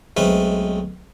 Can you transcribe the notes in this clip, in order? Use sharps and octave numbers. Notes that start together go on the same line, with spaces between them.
B1 G#3 A3 C4 B4 F5